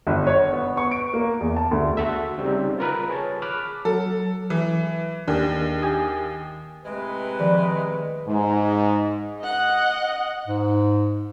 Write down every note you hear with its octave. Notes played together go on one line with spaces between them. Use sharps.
G1
C#5
B3
C#6
D7
A#3
E2
A5
D2
F#4 A4 E5
C#3 G3 C4 D#4
F4 A#4 B4
G#4 C#5 A5
B5 D6 F6 F#6
F#3 A4
E3
D#2 D4 G4 G#4
G4 G#5 D#6
A2 C3 G#3 B4
D#3 F3 D5
G#2
D#5 F#5
G#2